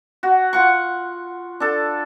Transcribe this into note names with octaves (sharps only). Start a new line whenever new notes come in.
F#4
F4 F#5 C#6
D4 A4